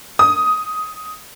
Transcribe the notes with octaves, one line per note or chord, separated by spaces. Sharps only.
D#6